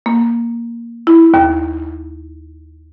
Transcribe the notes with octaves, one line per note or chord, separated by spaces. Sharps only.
A#3
E4
D#2